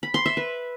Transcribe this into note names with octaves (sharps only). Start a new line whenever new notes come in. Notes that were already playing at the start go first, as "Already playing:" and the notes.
B5
C6
E5
B4